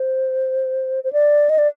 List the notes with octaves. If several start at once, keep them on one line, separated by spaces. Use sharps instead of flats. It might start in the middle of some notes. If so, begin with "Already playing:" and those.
Already playing: C5
C5
D5
D#5
D5